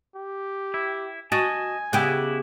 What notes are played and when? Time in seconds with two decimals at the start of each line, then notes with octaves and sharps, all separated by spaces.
0.15 G4
0.74 E4
1.32 F#4 D#5 G#5 A5
1.93 C#3 B3 E4 G4 F#5